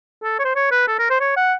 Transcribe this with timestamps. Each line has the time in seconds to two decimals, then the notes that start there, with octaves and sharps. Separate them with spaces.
0.23 A4
0.39 C#5
0.45 C5
0.56 C#5
0.72 B4
0.88 A4
0.99 A#4
1.10 C5
1.21 C#5
1.37 F#5